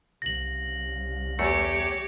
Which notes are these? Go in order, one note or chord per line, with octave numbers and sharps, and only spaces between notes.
C2 C#3 A#6 F#7
E2 A3 G4 C#5 C#7